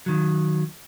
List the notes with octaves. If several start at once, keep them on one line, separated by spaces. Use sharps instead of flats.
D#3 F#3